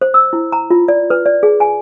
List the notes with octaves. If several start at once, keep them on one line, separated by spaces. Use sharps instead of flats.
C5
E6
E4
A#5
F4
D5
B4
D5
G#4
G#5